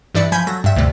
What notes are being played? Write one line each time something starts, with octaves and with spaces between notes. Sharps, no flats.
G2 E3 D4 D5 B5 C#7
F3 G#5 B5 G6 G#6 B6
F#3 A4 A#6
G2 E5
D2 G2 C3 A3